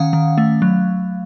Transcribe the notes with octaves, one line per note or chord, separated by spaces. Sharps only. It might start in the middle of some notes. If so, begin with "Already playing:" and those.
Already playing: D#3 C#4 F5 F#5
D#3
A3
F#3